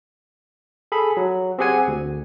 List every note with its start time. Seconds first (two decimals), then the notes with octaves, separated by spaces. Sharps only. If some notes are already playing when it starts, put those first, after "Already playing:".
0.92 G#4 A4 B5
1.17 F#3
1.59 C4 G4 G#4 F#5 G#5
1.88 D2